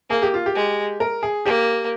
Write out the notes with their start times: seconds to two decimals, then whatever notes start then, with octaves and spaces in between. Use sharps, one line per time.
0.10 A#3 G#4
0.22 G4
0.34 F4
0.46 G4
0.55 G#3
1.00 A#4
1.23 G#4
1.45 A#3 G4